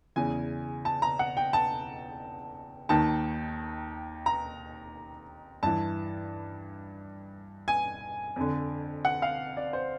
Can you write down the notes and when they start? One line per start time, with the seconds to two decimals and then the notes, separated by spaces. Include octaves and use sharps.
0.16 E2 C#3 E3 G#5
0.85 A5
1.02 A#5
1.19 F#5
1.37 G5
1.53 A5
2.89 D#2 D#3 A5
4.26 A#5
5.63 G2 E3 A5
7.68 G#5
8.36 F2 D3
9.05 F#5
9.22 F5
9.57 D5
9.73 C5